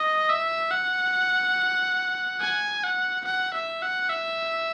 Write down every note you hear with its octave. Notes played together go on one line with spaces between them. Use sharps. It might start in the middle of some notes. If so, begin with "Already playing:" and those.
Already playing: D#5
E5
F#5
G#5
F#5
F#5
E5
F#5
E5